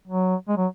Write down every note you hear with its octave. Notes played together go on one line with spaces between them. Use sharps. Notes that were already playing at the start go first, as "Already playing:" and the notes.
F#3
G#3
F#3